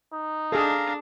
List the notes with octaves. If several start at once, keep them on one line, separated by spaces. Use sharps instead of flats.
D#4
D4 G#4 A4 F5 A#5